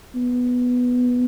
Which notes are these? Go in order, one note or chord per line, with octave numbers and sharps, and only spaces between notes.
B3